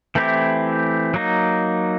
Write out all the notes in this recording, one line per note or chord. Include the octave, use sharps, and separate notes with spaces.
E3 A3 C4 E4 G4
F#3 A#3 D#4